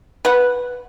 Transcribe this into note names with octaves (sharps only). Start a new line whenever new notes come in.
B4 F#5